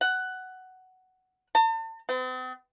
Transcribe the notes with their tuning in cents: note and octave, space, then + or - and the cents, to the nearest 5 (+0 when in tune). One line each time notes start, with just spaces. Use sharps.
F#5 +10
A5 +40
C4 -45